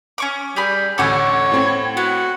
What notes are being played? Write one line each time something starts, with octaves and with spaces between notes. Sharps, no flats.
C#4 C#6 D6
G3 G4 G#4 B5
A1 D2 A4 C#5 F#5 G#5 D6
A2 C4 G#6
B3 F#4